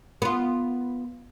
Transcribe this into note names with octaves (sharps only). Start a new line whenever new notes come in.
B3 F4